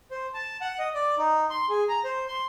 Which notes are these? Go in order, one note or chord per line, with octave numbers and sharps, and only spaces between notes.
C5
A5
F#5
D#5
D5
D#4
C6
G#4
A#5
C5
C6